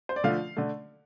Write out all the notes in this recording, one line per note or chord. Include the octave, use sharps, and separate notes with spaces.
C5
D5
D3 F3 A3 F5
D3 A3